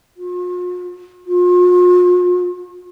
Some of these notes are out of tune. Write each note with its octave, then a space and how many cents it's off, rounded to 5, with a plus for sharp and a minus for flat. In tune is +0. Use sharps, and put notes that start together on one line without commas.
F4 +45
F4 +45